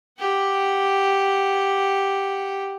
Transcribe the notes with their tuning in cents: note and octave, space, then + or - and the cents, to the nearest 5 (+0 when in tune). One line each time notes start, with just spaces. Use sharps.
G4 +0 F#5 +0